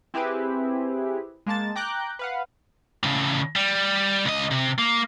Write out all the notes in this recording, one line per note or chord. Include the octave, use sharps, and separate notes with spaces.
C4 E4 G4 G#4 B4
G#3 A#3 A5 A6
G5 A#5 D6 F#6 G6
B4 F5 F#5
A2 C#3
G3
C#2 D#5
C3
A#3